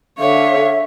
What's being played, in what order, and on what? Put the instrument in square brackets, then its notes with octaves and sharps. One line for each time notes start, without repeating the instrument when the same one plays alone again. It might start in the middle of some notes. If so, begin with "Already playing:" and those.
[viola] D3 C#5 [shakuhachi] E5 [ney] F5